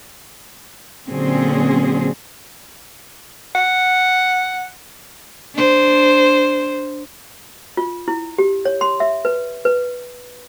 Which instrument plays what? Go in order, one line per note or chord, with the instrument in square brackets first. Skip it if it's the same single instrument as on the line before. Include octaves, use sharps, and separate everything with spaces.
[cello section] A#2 D3 F#3 C4 C#4 G#4
[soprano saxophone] F#5
[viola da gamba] D4 C5
[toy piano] F4
E4
G4
C#5
C6
E5
B4
B4